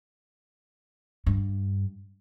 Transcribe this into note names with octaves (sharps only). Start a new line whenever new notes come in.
G2